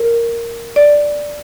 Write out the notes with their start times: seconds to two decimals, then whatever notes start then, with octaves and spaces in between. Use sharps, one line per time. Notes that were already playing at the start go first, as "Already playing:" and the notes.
Already playing: A#4
0.76 D5